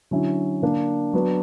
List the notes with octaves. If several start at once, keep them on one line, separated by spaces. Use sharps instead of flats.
D3 F#3 C#4 E4
D3 A#3 D4
F#3 B3 D4